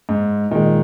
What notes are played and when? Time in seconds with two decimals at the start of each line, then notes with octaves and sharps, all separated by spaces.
0.09 G#2
0.51 A#2 D#3 G#3